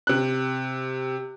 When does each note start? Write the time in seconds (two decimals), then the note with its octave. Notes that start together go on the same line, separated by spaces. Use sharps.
0.07 C3 F#6